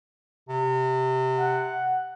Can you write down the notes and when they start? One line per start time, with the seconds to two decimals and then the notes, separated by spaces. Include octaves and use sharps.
0.49 C3
1.39 F#5